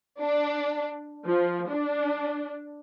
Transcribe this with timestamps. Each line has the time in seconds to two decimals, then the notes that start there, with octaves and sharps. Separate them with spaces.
0.20 D4
1.26 F3
1.69 D4